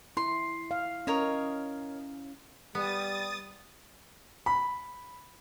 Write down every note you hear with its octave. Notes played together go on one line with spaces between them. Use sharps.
E4 C6
F5
C#4 A#4 C#5 D#5
G3 B3 D#6 A6
B5